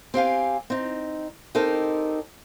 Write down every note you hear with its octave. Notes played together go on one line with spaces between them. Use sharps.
C4 G4 F5 G#5
C4 D#4
C4 D#4 G4 A4 A#4